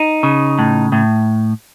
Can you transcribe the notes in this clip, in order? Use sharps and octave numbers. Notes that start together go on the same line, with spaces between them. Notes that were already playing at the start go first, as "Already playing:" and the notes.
Already playing: D#4
C#3
A2
A2